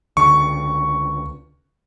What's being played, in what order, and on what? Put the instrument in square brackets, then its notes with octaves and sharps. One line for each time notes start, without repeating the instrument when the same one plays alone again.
[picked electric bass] C#2 D3 [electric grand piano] C#6